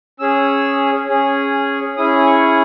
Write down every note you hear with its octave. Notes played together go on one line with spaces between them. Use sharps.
C#4 G#4 E6
C#4 G#4
C#4 E4 G#4 D#6
C#6